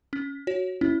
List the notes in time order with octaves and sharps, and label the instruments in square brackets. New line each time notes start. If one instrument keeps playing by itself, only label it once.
[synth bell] C#4
F#4 C#5
[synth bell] C#4 [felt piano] E4